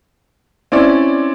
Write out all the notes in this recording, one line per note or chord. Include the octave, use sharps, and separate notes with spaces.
C4 C#4 E4 D5